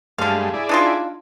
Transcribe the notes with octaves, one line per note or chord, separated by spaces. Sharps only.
G2 D3 G#3 A3 F5
E4 G#4 D5
D4 D#4 F4